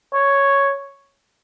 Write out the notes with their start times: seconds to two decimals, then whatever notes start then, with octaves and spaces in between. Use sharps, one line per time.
0.15 C#5